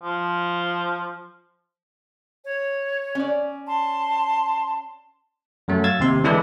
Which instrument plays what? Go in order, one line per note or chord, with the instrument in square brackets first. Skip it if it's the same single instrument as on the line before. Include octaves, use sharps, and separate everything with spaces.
[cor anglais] F3
[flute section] C#5
[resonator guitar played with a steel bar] C#4 D5
[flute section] A5 C6
[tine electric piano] F#2 F#3 A3
F5 E6 G#6 A6
D#2 C3 C6
D3 E3 G#3 D4 E4 B4